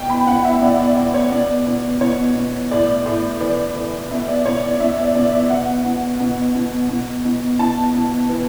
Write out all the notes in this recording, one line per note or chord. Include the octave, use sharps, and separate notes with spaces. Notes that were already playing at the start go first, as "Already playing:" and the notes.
Already playing: B2 G5
B5
B2 F#5
E5
B2 D5
D5
B2 D5
C#5
B2 D5
B2
B2 C#5
B2
A2 D5
A2
E3 D5
E3
B2 E5
D5
B2 C#5
D5
B2 E5
D5
B2 D5
E5
B2 F#5
B2
B2
B2
B2
B2
B2 A5
B2
E3